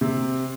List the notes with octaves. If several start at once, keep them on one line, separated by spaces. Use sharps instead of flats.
C3